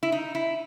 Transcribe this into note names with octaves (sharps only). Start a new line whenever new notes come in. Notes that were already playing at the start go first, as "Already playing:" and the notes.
E4
D#4
E4